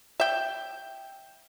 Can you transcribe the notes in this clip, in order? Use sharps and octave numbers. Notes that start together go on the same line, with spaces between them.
E5 G5